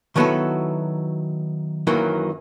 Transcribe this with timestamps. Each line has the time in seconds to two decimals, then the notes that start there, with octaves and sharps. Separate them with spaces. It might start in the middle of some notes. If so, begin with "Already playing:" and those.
0.16 D#3 F#3 B3 E4 F#4 A4
1.87 F#2 D#3 E3 F#3 A#3